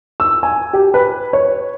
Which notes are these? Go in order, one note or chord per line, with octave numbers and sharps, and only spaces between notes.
E6
G#5
G4
B4
C#5